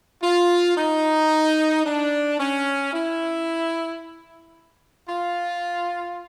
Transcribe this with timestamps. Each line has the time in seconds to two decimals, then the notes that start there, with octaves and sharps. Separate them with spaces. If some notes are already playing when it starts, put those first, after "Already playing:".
0.23 F4
0.77 D#4
1.86 D4
2.40 C#4
2.93 E4
5.09 F4